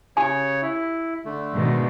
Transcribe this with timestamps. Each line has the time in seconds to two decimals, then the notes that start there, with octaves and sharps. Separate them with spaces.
0.17 C#3 G4 C#5 G#5
0.63 E4
1.25 D3 A3
1.55 G#2 B2 D#3